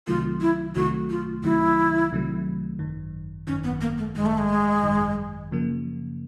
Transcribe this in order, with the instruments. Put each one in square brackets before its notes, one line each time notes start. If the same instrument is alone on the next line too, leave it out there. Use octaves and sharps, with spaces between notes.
[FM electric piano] C2 C3 D#3 F#3 A3 [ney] F4
[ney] E4
[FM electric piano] C2 C3 D#3 F#3 A3 [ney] F#4
[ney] F4
[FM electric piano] C2 C3 D#3 F#3 A3 [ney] E4
[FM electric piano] C2 C3 D#3 F#3 A3
G#1 F#2 D#3
[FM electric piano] G#1 F#2 D#3 [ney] C#4
[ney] B3
A#3
A3
[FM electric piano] G#1 F#2 D#3 [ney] G#3
[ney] A3
G#3
[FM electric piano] G#1 F#2 D#3
F#2 C#3 F3 A#3